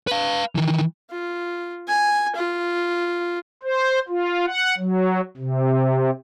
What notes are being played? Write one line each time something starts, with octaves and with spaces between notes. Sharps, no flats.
B4 F5
D#3 E3
F4
G#5
F4
C5
F4
F#5
F#3
C3